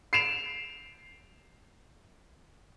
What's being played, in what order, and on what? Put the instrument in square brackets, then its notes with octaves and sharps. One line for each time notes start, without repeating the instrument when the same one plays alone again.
[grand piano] C7 D7 E7 F7